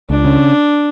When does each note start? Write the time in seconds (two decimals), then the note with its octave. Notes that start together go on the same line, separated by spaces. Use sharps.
0.10 C#2 D4
0.25 C#3